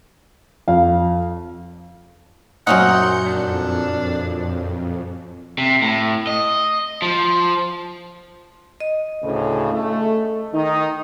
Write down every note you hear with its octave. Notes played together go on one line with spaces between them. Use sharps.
F2 F5
F#2 A#2 C4 C#4 D#4 F#5 G6 C#7
F2 D4
C3
A2
D#5
F3
D#5
D2 A2 C#3
A3
D#3 D#4